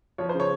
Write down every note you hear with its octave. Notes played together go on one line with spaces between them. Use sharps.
F3 C#5
C5
C#3
C#5